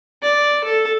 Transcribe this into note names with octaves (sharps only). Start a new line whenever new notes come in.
D5
A4